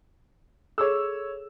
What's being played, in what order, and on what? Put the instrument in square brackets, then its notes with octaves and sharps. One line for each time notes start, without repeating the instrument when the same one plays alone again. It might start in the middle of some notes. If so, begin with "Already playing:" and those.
[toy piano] G#4 A4 [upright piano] C#5 E6